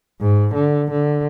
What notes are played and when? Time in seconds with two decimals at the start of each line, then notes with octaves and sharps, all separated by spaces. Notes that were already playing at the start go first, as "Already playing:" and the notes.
0.21 G#2
0.55 D3
0.91 D3